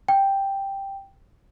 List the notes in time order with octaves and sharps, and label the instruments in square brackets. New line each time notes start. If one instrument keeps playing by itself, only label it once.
[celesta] G5